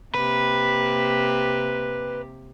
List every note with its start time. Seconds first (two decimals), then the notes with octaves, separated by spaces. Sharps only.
0.15 C3 A#3 G4 B4